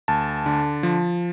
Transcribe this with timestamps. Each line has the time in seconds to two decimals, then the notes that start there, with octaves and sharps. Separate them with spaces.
0.08 D2 A5
0.46 D3
0.83 F3